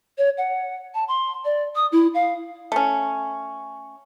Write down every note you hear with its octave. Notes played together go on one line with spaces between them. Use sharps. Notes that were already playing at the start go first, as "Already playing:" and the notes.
C#5
F#5
A5
C6
D5
D#6
E4
F5
A3 C#4